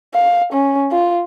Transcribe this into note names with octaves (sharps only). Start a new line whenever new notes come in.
F5
C#4
F4